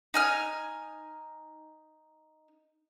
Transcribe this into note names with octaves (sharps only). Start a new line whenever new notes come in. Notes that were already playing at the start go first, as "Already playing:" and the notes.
D#4 G#5 F6